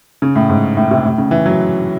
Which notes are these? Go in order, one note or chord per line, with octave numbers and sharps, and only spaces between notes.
C#3
A2
G#2
A2
C3
A2
C#3
E3
F#3